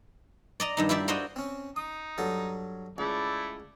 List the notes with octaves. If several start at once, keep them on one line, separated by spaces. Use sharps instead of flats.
D5 D#5 A#5
G2 D#3 D#4
E4 F4 G4 D5 E5
F#4 A#4 C5 D5 D#5 G5
C4 C#4
D#4 D#6
G2 F#3 A4
C#2 A3 E4 D5